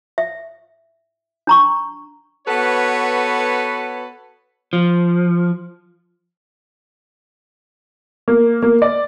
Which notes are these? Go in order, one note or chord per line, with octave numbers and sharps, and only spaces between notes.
E5
D4 A#5 C#6
B3 F#4 A4 B4 C#5
F3
A#3
A#3
D5